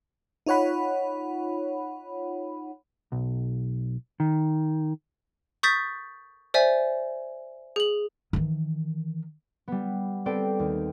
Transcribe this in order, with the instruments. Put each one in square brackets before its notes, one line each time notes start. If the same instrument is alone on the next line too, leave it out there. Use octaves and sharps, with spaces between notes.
[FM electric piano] D#4 F4 C#5 F#5 B5
[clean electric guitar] B1
D#3
[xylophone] C#6 D#6 G6 A6 B6
C5 D5 E5 G#5
G#4 F#7
[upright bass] D#3 E3
[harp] G3 B3
C4 A4 B4 D5 G5
D#2